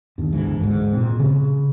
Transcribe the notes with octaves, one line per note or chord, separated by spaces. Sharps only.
G1 D#2
G1 D2 G#2 E3
D2 G#2
A#2 C4
C#3